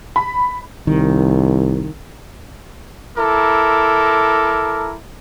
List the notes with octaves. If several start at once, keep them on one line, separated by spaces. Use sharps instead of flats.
B5
C2 D#3
E4 A4 A#4 A#5 D6